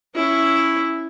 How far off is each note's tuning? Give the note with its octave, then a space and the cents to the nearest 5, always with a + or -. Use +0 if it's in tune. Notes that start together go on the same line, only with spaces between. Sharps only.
C#4 +0 E4 +0